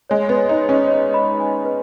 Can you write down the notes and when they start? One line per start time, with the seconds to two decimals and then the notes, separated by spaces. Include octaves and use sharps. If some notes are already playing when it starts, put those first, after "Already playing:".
0.10 G#3 C#5
0.29 B3
0.37 C#5
0.49 D#4
0.62 C#5
0.69 C#4
0.87 C#5
1.14 B5
1.40 G#5
1.65 B4